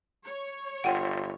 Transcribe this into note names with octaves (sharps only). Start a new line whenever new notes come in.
C#5
G1 F4 F#5 G5